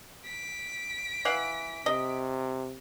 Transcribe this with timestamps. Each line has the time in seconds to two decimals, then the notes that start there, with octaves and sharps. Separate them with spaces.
0.25 B6 D7
1.25 E3 F5 F#5
1.86 C3 D#5